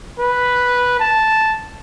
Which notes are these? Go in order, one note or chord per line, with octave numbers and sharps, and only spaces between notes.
B4
A5